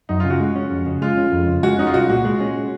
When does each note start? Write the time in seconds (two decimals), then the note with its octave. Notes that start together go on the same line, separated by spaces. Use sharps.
0.09 F#2 D#4
0.20 F4
0.24 C#3
0.30 F#4
0.40 G#3
0.56 C#4
0.71 F2
0.86 C#3
1.02 G#3 F4
1.18 C#4
1.32 F2
1.48 C#3
1.63 G#3 F#4
1.79 C#4 D#4
1.87 F4
1.94 C2 F#4
2.10 A#2 F#4
2.25 G#3
2.41 C#4